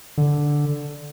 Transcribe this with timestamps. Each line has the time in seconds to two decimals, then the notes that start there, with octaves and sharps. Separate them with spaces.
0.18 D3